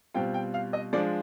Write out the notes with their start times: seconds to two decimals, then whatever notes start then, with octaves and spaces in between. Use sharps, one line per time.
0.14 B2 G3 C4 F4 G5
0.34 G5
0.54 F5
0.73 D#5
0.93 F3 G#3 D4 F4 D5